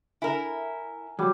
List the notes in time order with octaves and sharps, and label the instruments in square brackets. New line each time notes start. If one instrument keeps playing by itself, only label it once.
[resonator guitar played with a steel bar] E4 A#4 [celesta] G#5
[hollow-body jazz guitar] F#3 [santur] G3